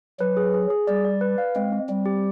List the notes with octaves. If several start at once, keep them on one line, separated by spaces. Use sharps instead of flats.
F#3 B4
G#4
G#4
G#4
G3 D5
D5
B4
F5
G#3 C4
C4
G3 C4
G4